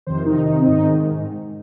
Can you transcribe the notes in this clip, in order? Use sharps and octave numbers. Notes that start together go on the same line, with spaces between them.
F2 C3 D#3 C5
D#4
D#4
C4
G#2 D#3 D#4